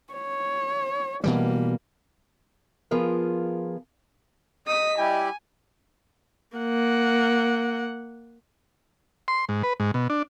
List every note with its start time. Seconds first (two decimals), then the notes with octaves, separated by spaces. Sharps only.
0.13 C#5
1.24 B2 E3 G3 A#3
2.91 F3 B3 F4 G#4 A#4
4.67 D#5 D#6 B6
4.98 G3 E4 G4 G5 G#5
6.57 A#3 F#5
9.28 C6
9.49 G#2
9.63 B4
9.80 G#2
9.94 B2
10.10 D4